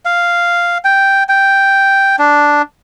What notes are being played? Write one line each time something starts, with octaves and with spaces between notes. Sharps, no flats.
F5
G5
G5
D4